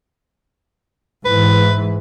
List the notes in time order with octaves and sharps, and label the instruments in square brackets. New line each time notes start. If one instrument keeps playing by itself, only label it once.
[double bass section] G#2 E3 [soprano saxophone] B4